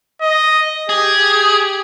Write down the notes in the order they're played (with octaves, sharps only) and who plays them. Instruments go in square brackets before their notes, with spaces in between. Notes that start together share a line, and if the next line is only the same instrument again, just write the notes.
[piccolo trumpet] D#5
[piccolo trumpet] G4 [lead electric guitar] G#4